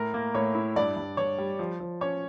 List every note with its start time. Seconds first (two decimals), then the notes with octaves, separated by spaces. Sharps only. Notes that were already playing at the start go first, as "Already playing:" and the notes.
Already playing: A2 A#4
0.14 A#3
0.34 A2 C#5
0.55 E4
0.76 G2 D5
0.96 G2
1.17 G2 C#5
1.38 G3
1.59 F3
1.80 F3
2.01 C#4 C#5